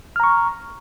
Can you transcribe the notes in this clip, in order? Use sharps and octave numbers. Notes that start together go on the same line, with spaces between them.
A#5 C#6 F6